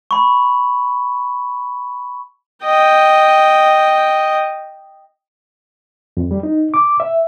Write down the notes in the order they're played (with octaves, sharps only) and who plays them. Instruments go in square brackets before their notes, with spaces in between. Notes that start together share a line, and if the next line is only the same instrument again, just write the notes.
[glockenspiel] B5 C#6
[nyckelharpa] D#5 G5
[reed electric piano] F2
G3
D#4
D6
E5